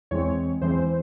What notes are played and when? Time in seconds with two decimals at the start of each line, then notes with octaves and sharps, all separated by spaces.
0.11 E2 E3 G#3 C4 C#5
0.61 E2 E3 G#3 C4 C5